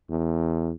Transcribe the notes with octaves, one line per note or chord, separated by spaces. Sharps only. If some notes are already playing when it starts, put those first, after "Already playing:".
E2